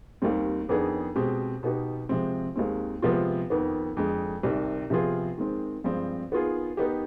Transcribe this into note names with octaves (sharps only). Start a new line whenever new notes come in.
D#2 D#3 G3 C4
F2 D#3 B3 D4 G#4
B2 G#3 C4 G4
B2 B3 D#4 G4
C3 F3 G#3 C4
D#2 D#3 G#3 C4
C3 F3 G#3 B3 F4
F2 D#3 B3
F2 D3 G#3
C2 C3 D#3
C3 F3 B3 F4 G#4
D#3 G#3 C4
G2 F3 G#3 C4
D#3 B3 F4 G#4
D#3 B3 D#4 G4